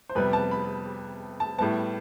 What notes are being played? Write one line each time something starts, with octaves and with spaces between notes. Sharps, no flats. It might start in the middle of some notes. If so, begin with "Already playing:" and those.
C5
F2 C3 G3 B3 B4
A5
B5
A5
A2 G3 B3 A5